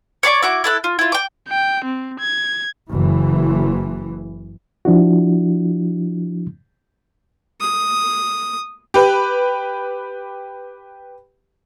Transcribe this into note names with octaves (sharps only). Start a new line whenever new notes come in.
C#5 D5 C6 D6
E4 F#4 D6
E4 A4 F#6
F4
E4 F4
G5 D6
G5
C4
G#6
F#1 E3
F3 D4 E4 F#4
D#6
G4 B4